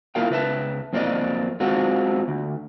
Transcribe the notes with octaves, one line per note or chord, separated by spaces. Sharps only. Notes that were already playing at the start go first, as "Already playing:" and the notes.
A#3 E4 F4 A#4 F5 G5
C#2 B4 E5 A5
F2 A#3 C4 D#4 D5 D#5
G#3 C4 F4 F#4
D2